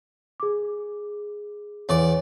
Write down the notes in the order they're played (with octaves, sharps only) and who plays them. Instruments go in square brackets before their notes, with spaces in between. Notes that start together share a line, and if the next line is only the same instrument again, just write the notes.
[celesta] G#4 D6
[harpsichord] E2 D5 [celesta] C#5